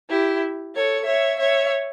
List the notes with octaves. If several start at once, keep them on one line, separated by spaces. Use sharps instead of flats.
E4 G4
A4 C#5
C#5 E5
C#5 E5